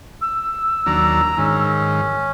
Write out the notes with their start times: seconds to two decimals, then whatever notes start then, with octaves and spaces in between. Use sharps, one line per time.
0.21 E6
0.86 D#2 F#3 D4 A#5
1.38 G#2 D#3 C#4